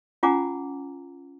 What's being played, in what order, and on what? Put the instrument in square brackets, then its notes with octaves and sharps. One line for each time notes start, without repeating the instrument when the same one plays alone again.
[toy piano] C#4 F4 F#5 G#5 A#5 D6